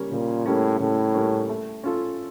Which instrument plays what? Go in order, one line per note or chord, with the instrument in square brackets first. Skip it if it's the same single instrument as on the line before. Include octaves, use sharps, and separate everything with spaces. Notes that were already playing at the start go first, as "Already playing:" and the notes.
Already playing: [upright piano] C#3 G3 A#3 C#4
[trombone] A#2 [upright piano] C#3
[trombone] A2 [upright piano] G3 A#3 C#4
[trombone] A2 [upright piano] C#3
[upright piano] G3 A#3 C#4
A3
C#4 F4 A4